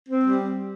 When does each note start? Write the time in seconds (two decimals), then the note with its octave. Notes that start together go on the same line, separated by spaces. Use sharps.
0.09 C4
0.24 G3